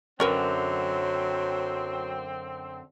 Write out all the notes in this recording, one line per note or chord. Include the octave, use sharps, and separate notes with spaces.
F#2 D3 F#3 C4 C#4 A#4 B4